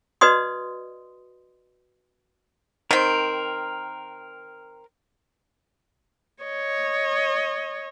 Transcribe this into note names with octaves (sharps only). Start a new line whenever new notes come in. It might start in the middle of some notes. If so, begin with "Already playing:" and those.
F#4 B4 D5 D#5 C6 D#6
D#3 C4 A#4
C#5 D#5